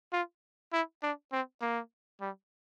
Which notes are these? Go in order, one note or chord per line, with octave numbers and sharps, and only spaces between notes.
F4
E4
D4
C4
A#3
G3